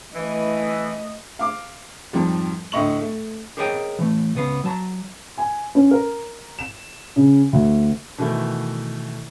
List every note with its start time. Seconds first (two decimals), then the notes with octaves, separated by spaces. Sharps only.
0.15 E3 A3 D#5
1.39 F5 D6
2.13 F2 G#2 F3 G3
2.72 D2 A2 D#5 C#6 F#7
3.01 A3
3.57 G4 G#4 A#4 C#5 D#5 G5
3.99 E3 A3
4.35 C#2 B3 F5
4.64 F#3 A5 A#5
5.38 G#5
5.75 C#4
5.91 A#4
6.59 E7
7.16 C#3
7.53 D2
8.18 B2 D#3 E3 A3